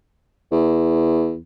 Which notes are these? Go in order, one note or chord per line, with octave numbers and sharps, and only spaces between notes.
E2